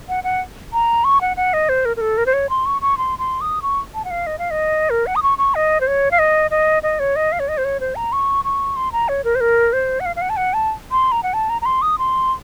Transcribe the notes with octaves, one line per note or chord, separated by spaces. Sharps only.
F#5
F#5
A#5
C#6
F#5
F#5
D#5
C5
A#4
A#4
A4
A#4
C5
C#5
C6
C#6
C#6
C6
C6
D#6
C#6
A5
F#5
F5
D#5
F5
D#5
A#4
F#5
D#6
C#6
C#6
D#5
C5
C#5
F5
D#5
D#5
D#5
C#5
D#5
F5
C#5
D#5
C5
C#5
C5
A#5
C#6
C#6
C6
A#5
C#5
A#4
C5
A#4
C5
F#5
F5
F5
F#5
A5
F#5
A5
C6
A#5
F#5
A5
A#5
A#5
C6
D#6
C6